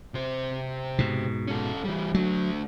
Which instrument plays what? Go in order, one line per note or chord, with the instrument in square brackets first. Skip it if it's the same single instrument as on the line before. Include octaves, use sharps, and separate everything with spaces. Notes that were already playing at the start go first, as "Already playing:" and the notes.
[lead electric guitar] C3 C5
[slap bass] G#2 B2
[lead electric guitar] C#4 A4
E3 G3
[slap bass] F#3 [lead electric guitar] A3 D4